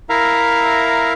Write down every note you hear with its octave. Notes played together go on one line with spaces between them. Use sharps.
E4 A#4 E5 F5 A#5